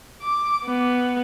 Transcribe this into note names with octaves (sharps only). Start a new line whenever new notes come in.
D6
B3